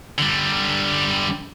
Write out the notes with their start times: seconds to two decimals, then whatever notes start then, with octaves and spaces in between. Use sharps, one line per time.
0.18 D3 G3